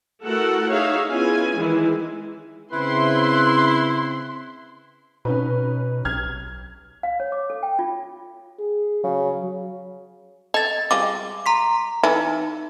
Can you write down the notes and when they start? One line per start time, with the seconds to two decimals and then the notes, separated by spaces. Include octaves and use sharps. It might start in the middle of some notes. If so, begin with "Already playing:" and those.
0.25 A3 E4 F#4 A4 A#4 F#5
0.70 D#4 G#4 C#5 E5 F5
1.08 B3 C#4 E4 F4 G#4 G#5
1.55 D#3 E3 G#3 E4
2.72 C#3 C4 E4 B4 C6
5.25 B2 C#4 D#4 B4
6.05 B1 F6 G#6
7.03 F5
7.20 C#5
7.32 D6
7.50 A4
7.63 G5
7.79 F4
8.59 G#4
9.04 C#3 F#3
10.54 A4 D#5 A6
10.91 G3 G#3 F4 D6
11.46 A#5 C6 B6
12.03 E3 D#4 E4 A4